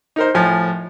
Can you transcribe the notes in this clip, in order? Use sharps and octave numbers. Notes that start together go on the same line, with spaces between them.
D#4 A#4 C5
A2 F3 G#5